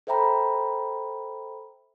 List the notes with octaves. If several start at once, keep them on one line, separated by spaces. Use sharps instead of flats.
A4 C5 E5 G5 A#5 B5